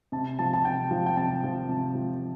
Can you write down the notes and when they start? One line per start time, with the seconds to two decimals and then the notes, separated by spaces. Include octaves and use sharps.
0.12 C3 A5
0.39 F3 A5
0.53 A5
0.64 C3 G5
0.91 F3
1.06 G5
1.17 C3 A5
1.44 F3
1.69 C3
1.95 F3